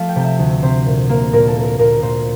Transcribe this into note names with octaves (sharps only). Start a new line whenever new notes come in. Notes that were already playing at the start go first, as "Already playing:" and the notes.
Already playing: F3 A3 F5 A5
G5
C3
E5
D2
C3 C5
A#2
A#3
A#2 A#4
A4
A#3
A#4
A#2 A#4
A#2 C5